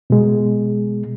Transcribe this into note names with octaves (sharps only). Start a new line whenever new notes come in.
B2 G#3